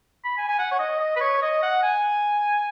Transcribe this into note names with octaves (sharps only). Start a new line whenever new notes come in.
B5
G#5
G#5
F#5
C#5
D#5
D#5
B4
C#5
D#5
F#5
G#5